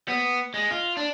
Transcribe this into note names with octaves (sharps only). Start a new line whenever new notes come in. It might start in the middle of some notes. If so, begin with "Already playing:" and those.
B3
G#3
F4
D4